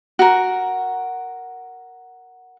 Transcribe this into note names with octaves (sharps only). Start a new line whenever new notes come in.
F#4 A#4